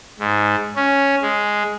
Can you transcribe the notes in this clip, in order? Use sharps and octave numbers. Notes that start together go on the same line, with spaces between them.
G#2
C#4
G#3